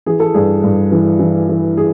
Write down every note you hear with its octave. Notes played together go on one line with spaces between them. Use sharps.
E3 G#4
A4
G2 G#4
G2
E3
E3
E3
G#4